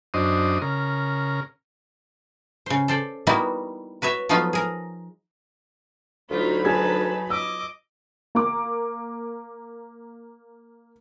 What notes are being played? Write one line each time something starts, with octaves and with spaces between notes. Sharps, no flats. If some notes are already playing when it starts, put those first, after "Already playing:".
F#2 D4 C5 D#5
C#3 A#4
C#3 C5
A4 C5 D5
G3 A#3 B3 D#4 E4 F#4
F#4 B4 C#5 E5
F3 F#3 A3 B3 D#4 F4
G#4 A#4
D2 F#3 D#4 F4 B5
G#4 B4 A5 G#6
D#5 D6 E6
A#3 D6